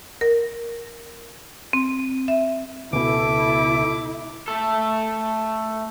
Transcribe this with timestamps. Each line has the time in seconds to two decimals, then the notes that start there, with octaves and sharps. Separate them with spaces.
0.21 A#4
1.73 C4
2.28 E5
2.93 C#2 B2 E4 A4 D6
4.48 A3 A4